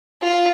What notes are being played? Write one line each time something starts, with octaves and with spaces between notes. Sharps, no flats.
F4